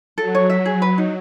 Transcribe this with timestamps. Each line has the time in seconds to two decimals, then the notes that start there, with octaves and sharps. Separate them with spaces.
0.18 F#3 A4
0.35 C#5
0.50 E5
0.65 G#4
0.82 B4
0.98 D#4